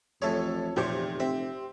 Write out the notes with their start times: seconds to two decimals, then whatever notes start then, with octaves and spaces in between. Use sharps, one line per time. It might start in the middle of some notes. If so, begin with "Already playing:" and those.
0.22 A1 F2 A2 G#4 A4 C#5
0.76 F1 E2 A#2 F3 G4 C5 C#5 G5
1.20 C4 E5